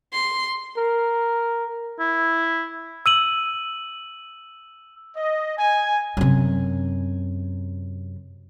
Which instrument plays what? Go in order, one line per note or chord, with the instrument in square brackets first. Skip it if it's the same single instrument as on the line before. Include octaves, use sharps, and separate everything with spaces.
[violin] C6
[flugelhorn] A#4
[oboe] E4
[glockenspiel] E6 D#7 F#7
[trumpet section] D#5
G#5
[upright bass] F#2 C3